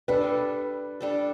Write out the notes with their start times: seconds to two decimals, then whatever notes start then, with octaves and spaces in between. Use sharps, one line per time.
0.08 G3 D4 A4 B4
1.01 G3 D4 A4